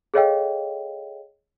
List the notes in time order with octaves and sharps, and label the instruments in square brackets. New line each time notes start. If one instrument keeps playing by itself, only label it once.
[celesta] G#4 A4 C#5 D#5 F5 G5